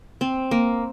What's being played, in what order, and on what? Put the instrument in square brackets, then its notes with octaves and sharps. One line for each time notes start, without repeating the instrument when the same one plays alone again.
[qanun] C4
A#3